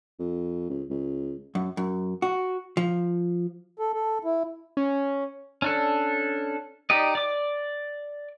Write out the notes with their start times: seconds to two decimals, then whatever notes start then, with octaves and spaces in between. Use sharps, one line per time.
0.19 F2
0.70 C#2
0.90 C#2
1.55 F#2
1.77 F#2
2.22 F#4
2.77 F3
3.79 A4
3.94 A4
4.25 E4
4.77 C#4
5.62 C#4 D4 A4
6.90 D#4 G4 D5 D#5
7.15 D5 D6